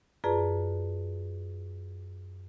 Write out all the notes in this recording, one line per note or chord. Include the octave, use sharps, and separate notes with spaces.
F#2 F4 G#4 B4 D5 A5